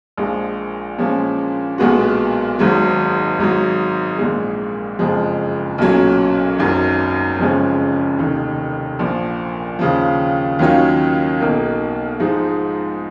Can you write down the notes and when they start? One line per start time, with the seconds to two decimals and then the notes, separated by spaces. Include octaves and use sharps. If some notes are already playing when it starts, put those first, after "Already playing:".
0.18 A#1 A#2 F3 G#3
0.98 A#2 F3 G#3 C#4
1.78 B1 A#2 G#3 B3 F#4
2.59 G#1 G#2 F#3
3.39 G#1 G#2 F#3
4.18 A#1 A#2 G#3
4.99 F#1 F2 F3 G#3
5.78 B1 A#2 F#3 C#4
6.58 G#1 F#2 D#3 F#3
7.39 F#1 F2 F3 G#3 C#4
8.19 F1 D#2 D#3
8.99 A#1 A#2 F3
9.79 D#2 C#3 F3
10.59 D#2 D#3 F#3 C#4 F4
11.40 B1 B2 A#3 D#4
12.20 G#2 F3 G#3 D#4